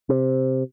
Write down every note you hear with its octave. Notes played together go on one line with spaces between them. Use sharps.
C3